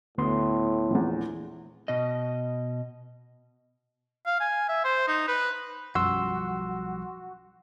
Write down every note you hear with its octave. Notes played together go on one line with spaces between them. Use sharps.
D2 A2 B3 C6
A#1 E2
B2 D#5
F5
G#5
E5
C5
D#4
B4
B1 F#2 F3 G3 F#4 C6 E6